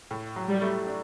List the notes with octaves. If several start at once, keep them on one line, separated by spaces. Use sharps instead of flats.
A2
F#3
G3
A3
D4